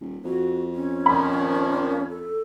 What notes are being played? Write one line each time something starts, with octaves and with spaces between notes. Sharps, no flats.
D#1
F2 F#4
C#4
A#2 D#3 F3 B5
A4